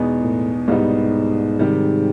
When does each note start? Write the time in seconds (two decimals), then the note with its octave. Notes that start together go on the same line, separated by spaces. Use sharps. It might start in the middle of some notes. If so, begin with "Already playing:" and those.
Already playing: E2 B2 G#3 B3 D#4
0.22 A2
0.68 C2 G#2 B2 G3 B3 D#4
1.59 C3 D#3 G3